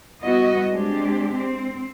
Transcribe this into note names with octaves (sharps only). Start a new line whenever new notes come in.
G3 B3 E4 F#4 D#5
G#3 C4 D4 G4
C4